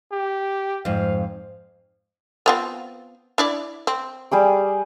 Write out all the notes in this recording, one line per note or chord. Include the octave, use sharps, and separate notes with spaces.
G4
F2 G#2 F5
B3 C4 F4
D4 E4 D5
C4
G3 G#4 D6